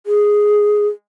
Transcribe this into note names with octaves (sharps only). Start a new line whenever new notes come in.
G#4